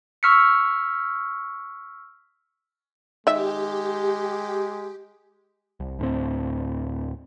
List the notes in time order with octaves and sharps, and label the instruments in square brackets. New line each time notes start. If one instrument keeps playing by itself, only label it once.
[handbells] C#6 E6 F6 B6 C#7
[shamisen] D#3 E5 [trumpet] G#3 [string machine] G4
[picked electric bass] C2
D2 A2 C4